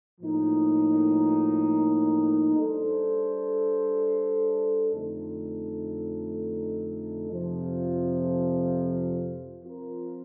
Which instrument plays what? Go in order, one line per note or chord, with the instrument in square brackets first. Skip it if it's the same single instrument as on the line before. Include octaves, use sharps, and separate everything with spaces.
[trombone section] A2 F3 A#3 D#4
G3 D4 A4 C5
F2 D3 A3 D#4 A4
F2 C3 F3
F3 C4 F4 A#4